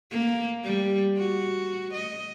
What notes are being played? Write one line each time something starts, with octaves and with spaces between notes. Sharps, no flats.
A#3
G3
F#4
D#5